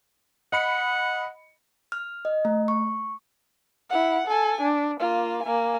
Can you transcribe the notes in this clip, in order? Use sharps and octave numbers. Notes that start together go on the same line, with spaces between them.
D#5 F#5 B5 C#7
F6
D#5
A3
C#6
E4 F#5
A4 G#5
D4
A#3 F4
A#3 G#5